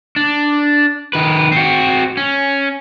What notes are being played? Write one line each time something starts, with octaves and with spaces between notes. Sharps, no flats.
D4
D#3 B4
C4 F#4
C#4